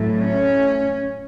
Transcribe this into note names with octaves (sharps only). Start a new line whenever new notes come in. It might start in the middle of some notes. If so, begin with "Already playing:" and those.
Already playing: A2 F#3 A3
C#4